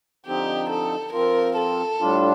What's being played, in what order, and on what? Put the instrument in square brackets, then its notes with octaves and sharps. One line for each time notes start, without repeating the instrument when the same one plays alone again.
[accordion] D3 F3 C4 D#4 [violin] G4
[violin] A4
[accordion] F3 C4 F4 [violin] A#4
[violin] A4
[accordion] A2 G3 D4 F4